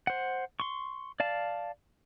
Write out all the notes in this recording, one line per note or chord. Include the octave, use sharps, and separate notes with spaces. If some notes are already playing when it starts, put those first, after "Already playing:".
C5 F#5
C6 C#6
D5 F5 A5